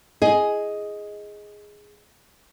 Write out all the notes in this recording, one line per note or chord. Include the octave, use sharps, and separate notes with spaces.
G#4 D#5